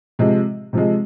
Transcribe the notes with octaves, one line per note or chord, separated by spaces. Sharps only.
C3 F3 G#3
C3 F3 G#3